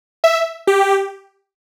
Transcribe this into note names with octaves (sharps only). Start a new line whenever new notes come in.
E5
G4